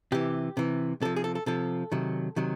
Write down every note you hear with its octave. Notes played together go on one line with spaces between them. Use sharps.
C3 E3 G4
C3 E3
C3 F3 A4
G#4
A4
A4
C3 F3 A4
C3 D#3 F#3
C3 D#3 F#3